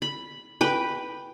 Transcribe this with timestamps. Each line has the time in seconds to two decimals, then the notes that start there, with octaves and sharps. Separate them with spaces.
0.02 B5
0.61 B4 G5